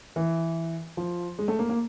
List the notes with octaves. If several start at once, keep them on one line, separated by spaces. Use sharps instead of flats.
E3
F3
G#3
A3
A#3
A#3